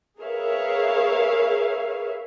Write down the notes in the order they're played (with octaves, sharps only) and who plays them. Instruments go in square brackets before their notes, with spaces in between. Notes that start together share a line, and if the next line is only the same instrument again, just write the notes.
[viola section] G#4 A#4 B4 C#5 E5 F5